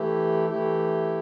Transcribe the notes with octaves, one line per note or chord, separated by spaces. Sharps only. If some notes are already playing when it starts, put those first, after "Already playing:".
Already playing: E3 A3 E4 G4
E3 A3 E4 G4